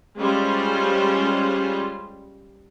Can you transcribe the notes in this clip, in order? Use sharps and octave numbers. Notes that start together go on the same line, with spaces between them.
G3 G#3 C#4 F4 C5